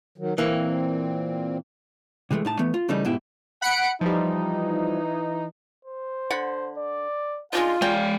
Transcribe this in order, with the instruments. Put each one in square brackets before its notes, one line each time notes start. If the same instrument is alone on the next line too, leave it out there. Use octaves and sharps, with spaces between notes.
[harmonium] D#3 F#3
[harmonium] A#2 C4 [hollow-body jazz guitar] E3 A#3
[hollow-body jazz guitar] C3 E3 G#3 A3
A2 D#4 A5
E3 A3 B3
F4
C#3 E3 G3 A3 D#4
G#2 B2 E4 G4
[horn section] F#5 [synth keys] B5 C#7 D7
[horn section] E3 D#4 [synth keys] F3 G3
[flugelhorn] C5
[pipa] D3 F#5 B5
[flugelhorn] D5
[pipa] G#3 D4 D#4 [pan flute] F4 [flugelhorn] F5
[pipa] C#3 G5 [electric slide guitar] G#3 D5